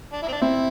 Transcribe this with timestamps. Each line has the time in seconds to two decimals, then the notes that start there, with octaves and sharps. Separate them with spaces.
0.12 D4
0.23 E4
0.28 C4
0.32 D4
0.42 C4 E4